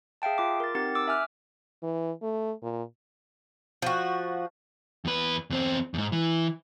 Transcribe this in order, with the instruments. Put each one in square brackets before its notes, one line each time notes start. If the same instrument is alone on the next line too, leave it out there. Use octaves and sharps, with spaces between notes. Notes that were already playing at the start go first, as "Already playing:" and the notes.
[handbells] G#4 E5 F5 G5 A5
F4 D6
A#4 A6
C4 D#4 G4 A#4 F#5 A6
D6 E6
E5 G#5 F6 F#6
[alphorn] E3
A3
A#2
[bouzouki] F3 F#4
[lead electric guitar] E2 B4
E2 C4
E2 G#2
E3